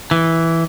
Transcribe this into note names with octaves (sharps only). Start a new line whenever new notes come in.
E3